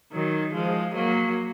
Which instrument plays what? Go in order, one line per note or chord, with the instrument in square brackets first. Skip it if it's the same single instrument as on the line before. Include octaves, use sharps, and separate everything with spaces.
[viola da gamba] D#3 F#3
F3 G#3
F#3 A#3